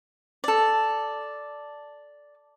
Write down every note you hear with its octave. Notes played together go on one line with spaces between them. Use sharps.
A4 D5